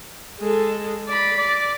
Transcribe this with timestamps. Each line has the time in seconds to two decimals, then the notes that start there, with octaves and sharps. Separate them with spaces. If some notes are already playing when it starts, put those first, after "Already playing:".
0.40 G#3 A4
1.08 D5 B5
1.37 D5